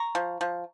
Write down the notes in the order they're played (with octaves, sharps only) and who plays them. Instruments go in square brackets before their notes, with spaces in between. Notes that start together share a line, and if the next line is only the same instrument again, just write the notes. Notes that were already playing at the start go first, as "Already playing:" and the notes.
Already playing: [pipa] A#5 C#6
F3
F3